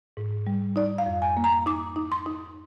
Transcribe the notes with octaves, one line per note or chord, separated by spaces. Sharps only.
G#2
G3
D#4 D5
F5
F2
G#5
A#3
A#5
D#4 D6
D#4
C6
D#4